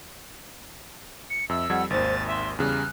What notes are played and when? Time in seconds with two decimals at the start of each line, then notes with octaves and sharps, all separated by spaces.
1.30 C#7
1.49 F2 E5 E6
1.70 F2 G3 F#5 G#6
1.90 G#1 D#2 C5 A6
2.27 E5 C6
2.59 E2 C#3 G3 F6 F#6